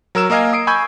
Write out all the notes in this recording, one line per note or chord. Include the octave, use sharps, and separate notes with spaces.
F#3 A#4 E6 E7
A#3 A#4 D#5 F5 G#5 G#6
D#6 C7 D7
G#5 B5 C#6 E6 G6 G#6